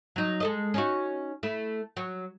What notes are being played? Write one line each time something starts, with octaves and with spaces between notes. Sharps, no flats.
F#3 D#4
G#3 A4 D#5
C#4 D#4 F#4
A3 E4
F#3